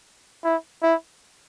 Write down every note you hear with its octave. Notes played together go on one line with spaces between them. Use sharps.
E4
E4